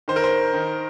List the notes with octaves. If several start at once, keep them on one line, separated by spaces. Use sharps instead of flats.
D#3 C5
A#4
C5
D#3